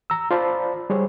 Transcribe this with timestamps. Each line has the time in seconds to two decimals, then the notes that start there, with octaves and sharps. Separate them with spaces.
0.10 A#5 E6
0.31 F4 C5 D5 A5 B5
0.90 G3 G#4 C5 C#5